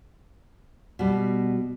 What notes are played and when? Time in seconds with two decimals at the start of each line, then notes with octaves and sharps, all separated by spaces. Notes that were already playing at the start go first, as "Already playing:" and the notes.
0.99 B2 G3